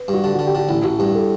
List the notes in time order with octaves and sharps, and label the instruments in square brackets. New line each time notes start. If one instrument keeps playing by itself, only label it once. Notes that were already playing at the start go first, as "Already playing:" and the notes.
Already playing: [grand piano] B4
[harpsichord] G2
[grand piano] F#4
[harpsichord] D3 [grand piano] G4
[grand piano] F#4
[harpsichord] D3
[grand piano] G4
[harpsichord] D3 [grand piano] F#4
[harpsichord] A1 [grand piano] E4
[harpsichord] A1 [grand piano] F#4
[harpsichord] G2 [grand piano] G4
[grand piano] A4